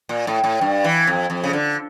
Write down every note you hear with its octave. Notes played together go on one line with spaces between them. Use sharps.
A#2
A2
A2
G2
E3
F2
F2
C#3
D3